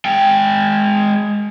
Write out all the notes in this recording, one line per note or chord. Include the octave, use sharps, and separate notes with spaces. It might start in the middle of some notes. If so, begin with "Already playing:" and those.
G#3 G5